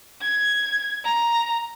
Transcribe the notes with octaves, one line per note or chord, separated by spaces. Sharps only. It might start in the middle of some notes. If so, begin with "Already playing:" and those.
G#6
A#5